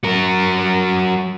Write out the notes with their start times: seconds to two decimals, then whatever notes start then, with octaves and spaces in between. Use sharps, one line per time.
0.04 F#3 A#4